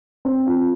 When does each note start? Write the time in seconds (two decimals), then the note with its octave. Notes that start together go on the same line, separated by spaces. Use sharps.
0.25 C4
0.46 F4